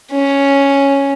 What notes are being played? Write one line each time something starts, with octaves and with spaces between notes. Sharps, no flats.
C#4